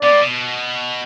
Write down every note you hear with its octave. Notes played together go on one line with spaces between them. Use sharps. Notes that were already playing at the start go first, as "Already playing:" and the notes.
B2 D5
A2
B2